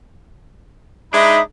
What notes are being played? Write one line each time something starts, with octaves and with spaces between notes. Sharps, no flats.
G#3 D4 D#4 E5 B5 D#6